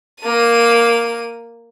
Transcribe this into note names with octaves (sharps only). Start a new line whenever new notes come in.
A#3 D#7